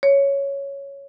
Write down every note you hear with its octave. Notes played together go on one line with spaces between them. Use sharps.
C#5